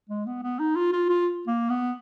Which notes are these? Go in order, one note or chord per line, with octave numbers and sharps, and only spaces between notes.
G#3
B3
B3
D#4
F4
F4
F4
A#3
B3